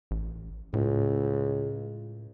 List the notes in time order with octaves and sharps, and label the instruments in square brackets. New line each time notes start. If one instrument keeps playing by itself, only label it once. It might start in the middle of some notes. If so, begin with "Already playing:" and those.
[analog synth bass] A1
[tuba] C#2 [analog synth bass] A2